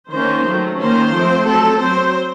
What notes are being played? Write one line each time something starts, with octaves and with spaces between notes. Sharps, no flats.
D#3 A#3 C#4 C5
D#3 F#3 A3
D#3 A#3 C#4 C5
F3 A3 C4
F#3 C4 A4
F#3 C4 C5